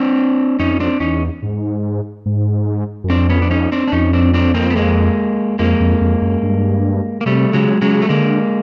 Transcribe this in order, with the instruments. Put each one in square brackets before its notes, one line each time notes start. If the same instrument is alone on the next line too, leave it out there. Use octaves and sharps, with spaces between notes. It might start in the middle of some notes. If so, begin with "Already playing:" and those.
Already playing: [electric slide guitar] C4 D4
[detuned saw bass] F2 [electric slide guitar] C#4 D#4
[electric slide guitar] C4 D4
[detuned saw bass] E2 [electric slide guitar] C#4 D#4
[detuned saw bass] G#2
G#2
F#2
[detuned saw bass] F2 [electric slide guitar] C4 D4
[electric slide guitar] B3 C#4
D4
C#4 D#4
C4 D4
D4
[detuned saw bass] F2 [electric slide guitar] C#4 D#4
[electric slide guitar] C4 D4
C4 D4
A#3 C4
B3
G#3 A#3
[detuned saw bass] F2 [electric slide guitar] G#3 A#3
[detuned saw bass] F2
F2
F#2
G2
[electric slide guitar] A#3
[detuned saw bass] C3 [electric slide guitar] G3 A3
[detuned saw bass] C#3 [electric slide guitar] F#3 G#3
[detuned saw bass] C#3 [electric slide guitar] F#3 G#3
[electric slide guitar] A3
[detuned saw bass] D3 [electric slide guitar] G#3 A#3